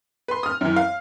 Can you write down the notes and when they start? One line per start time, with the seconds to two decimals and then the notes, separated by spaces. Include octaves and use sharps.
0.28 B4 C6
0.43 D#6 F6
0.61 F#2 E3
0.76 F5